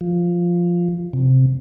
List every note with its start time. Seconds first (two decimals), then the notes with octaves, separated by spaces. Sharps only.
0.01 F3
1.13 C3